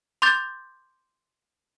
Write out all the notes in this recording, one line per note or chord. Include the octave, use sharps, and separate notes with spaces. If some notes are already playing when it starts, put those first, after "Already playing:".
C6 D6 G6 A6